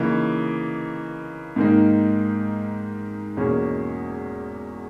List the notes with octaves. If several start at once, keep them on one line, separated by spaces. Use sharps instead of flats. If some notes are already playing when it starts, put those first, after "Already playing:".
Already playing: C#3 E3 A#3 D#4
G#2 D#3 A#3 D#4
E2 B2 A#3 C#4 G#4